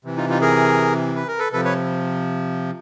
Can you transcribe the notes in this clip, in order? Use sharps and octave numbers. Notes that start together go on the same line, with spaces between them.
C3 E3
D#4 F4
D#4 F4
G#4 A#4
B4
A#4
A4 B4
C3 F3 A4 B4
B4 C#5